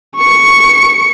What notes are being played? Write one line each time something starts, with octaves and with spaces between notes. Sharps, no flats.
C#6 C#7